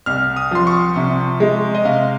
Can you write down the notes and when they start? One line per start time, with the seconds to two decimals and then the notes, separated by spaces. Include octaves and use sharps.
0.06 C2 F6
0.37 D#6
0.51 F3 C6
0.67 C#6
0.96 C3
1.40 G#3
1.75 D#5
1.84 C3 F5